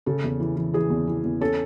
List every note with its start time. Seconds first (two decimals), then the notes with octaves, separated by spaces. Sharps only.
0.06 C#3 A4
0.24 E2
0.40 E3
0.56 E3
0.74 E3 G#4
0.90 E2
1.07 E3
1.24 E2
1.41 C#4 A4